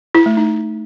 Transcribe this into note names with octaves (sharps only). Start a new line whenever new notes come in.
E4
A3
D#4